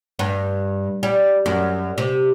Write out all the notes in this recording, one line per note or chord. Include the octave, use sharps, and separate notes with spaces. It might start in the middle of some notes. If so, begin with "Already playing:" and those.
G2
G3
F#2
C3